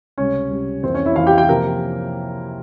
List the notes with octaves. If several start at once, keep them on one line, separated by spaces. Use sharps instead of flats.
C#2 C3 G3 C#4 C#5
C#2 C3 G3
F2 E3 A#3 C4 C#4 C5
C#4 C#5
E4 E5
F2 E3 A#3 C#4 F4 F5
G4 G5
G4 G5
C3 F3 A#3 A#4